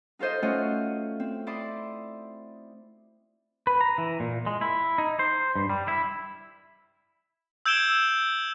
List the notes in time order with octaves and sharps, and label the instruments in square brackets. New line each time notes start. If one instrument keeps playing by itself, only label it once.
[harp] D#4 F4 A4 C5 D#5
A3 C#4 F4 F#4 D#5
C4
E4 D5 C6 D#6
[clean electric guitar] B4
A#5
E3
A#2
G#3
E4
D#4
C5
G2
G3
E4
[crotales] E6 G6 G#6 D7 E7 G7